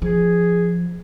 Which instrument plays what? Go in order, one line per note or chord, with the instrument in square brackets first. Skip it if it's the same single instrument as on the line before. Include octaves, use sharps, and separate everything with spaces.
[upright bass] F3 [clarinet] G#4